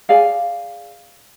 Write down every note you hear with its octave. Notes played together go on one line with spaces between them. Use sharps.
G#4 D5 F5 G#5